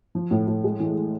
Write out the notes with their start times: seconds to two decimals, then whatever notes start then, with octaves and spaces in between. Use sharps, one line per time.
0.15 F3
0.31 A2
0.47 A2
0.64 G#3
0.80 E3